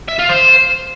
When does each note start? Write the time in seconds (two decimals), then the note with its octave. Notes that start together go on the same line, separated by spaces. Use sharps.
0.08 E5
0.19 F4
0.29 C5